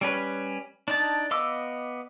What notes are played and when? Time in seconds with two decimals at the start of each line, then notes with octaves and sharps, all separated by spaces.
0.01 G3 C#4 B4
0.88 D4 D#4 A5
1.31 B3 D#5 F5 D6 E6